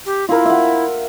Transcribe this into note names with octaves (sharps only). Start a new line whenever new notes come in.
G4
E4 F4 A#4
E5 F#5